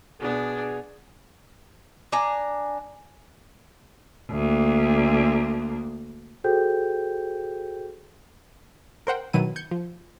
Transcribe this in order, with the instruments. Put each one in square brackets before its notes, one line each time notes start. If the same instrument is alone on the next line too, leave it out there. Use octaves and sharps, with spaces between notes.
[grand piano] B2 B3 [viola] D4 [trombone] G#4
[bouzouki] D4 G#5 A#5
[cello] D2 A#3
[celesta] F#4 G#4 A4 C5 G5 G6
[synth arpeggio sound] A#4 C5 F#5 G5
B2 D#3 F#3 E4 D#7
G6 G#6 C#7
F3